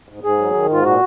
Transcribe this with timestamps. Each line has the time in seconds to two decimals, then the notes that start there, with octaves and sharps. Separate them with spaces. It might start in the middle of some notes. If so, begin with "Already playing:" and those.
0.09 G#2
0.24 G#2 G#4
0.39 F#3
0.54 D#3
0.70 G#2 F4
0.84 A#2 F#4